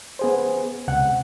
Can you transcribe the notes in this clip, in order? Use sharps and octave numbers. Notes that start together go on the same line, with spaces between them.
B3 G#4 C5
C#2 C3 F#5 F#6